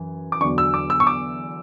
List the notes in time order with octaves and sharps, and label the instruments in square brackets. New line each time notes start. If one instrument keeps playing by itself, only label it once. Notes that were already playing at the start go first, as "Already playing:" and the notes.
Already playing: [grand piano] F#2 E3
D6
E2 D3 F#3 C#6
E6
D6
E6
C#6
D6